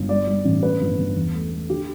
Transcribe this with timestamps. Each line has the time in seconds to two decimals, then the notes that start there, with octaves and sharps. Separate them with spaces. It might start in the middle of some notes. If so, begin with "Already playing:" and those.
Already playing: G1
0.09 G3 D5
0.27 G3
0.45 A1
0.63 D3 B4
0.81 G1
0.98 G1
1.16 E2
1.34 A3
1.51 A3
1.70 D3 G4